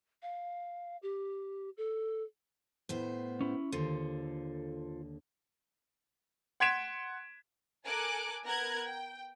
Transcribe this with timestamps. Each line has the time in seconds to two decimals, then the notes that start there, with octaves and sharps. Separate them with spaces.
0.22 F5
1.02 G4
1.77 A4
2.89 A2 B3 C5
3.41 C#4 E4
3.72 D#2 D3 F4 A4 C5
6.60 F#5 C6 G#6 B6 D7 E7
7.84 A4 A#4 G#5 D6 F#6
8.44 B3 A#4 A#5 F#6 G#6
8.84 G5